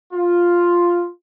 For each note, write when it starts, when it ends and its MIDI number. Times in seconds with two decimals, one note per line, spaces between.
0.13 1.07 65